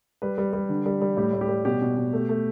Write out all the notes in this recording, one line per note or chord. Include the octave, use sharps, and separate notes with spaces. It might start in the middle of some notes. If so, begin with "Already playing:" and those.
G3 B4
G3
G3
D3
G3
G3
A2 G4
A2
G4
G3
B2 G4
B2
B2
A3
A3